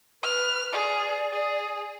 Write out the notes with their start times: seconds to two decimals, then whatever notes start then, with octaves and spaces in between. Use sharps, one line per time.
0.23 B4 F6
0.72 G#4 D5
1.33 G#4